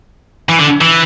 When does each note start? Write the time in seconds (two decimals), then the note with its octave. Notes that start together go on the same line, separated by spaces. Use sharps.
0.49 E3
0.59 D3
0.81 E3